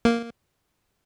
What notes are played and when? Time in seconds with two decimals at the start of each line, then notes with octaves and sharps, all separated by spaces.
0.05 A#3